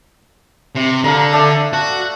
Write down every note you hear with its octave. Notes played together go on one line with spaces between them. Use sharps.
C3
D3 F5 A#5
A3 D4
F#4